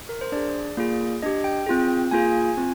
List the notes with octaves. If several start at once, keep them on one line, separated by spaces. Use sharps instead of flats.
A#4
C5
D4 G#4 D5
A#3 F4 G#4
D4 G4 D#5
G5
C4 F4 G#4
A#3 F4 G#4 G#5
C4 F4